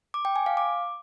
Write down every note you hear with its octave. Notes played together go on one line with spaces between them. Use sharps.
D6
G5
G#5
F5
D6